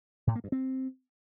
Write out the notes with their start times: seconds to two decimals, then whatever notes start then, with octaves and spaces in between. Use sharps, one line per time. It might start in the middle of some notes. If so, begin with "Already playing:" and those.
0.27 A2
0.35 A#3
0.44 G2
0.52 C4